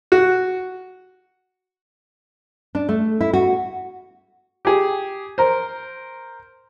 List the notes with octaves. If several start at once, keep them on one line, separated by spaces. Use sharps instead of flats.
F#4
D4
A3
E4
F#4
G4 G#4
A#4 C5